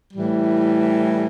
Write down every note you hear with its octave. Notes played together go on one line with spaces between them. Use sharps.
A2 E3 G3